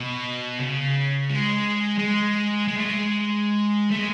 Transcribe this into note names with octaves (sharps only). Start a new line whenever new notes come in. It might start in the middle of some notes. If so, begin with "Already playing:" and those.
Already playing: B2
C#3
G#3
G#3
G#3
A3
G#3
A3
G#3